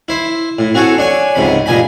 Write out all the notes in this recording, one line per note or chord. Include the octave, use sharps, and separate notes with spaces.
E4 C5
A2
C4 F#4 G#4 A4 C#5
D4 C#5 G#5
C#2 G#2 C3 B5
G2 A#2 D#5 G#5 B5